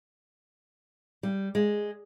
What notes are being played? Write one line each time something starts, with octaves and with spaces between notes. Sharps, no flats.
G3
G#3